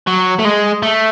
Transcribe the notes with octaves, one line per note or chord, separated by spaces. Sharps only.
F#3
A3
G#3
A3